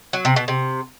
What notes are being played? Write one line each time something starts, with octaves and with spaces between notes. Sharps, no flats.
F#3
C3
B2
C3